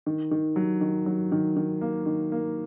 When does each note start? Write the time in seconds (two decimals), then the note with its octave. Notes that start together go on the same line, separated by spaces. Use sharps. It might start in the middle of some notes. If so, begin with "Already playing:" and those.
0.06 D#3
0.31 D#3
0.56 F#3
0.81 D#3
1.06 F#3
1.32 D#3
1.56 D#3
1.81 A#3
2.06 D#3
2.32 A#3